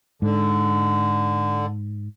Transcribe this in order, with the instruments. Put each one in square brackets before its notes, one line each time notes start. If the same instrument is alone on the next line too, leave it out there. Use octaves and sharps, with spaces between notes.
[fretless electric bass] G#2 [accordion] D3